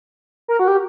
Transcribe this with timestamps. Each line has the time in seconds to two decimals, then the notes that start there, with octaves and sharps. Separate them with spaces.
0.48 A#4
0.59 F#4
0.68 G4